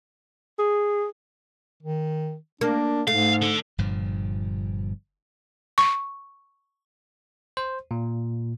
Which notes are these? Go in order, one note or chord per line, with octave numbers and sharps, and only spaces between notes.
G#4
D#3
A#3 D4
G#2 A3 F5
D3 A4
G1 G2 A#2 F3
C#6
C5
A#2